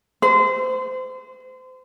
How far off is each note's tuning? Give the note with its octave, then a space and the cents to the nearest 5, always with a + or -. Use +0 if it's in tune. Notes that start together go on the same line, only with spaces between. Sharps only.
C5 -30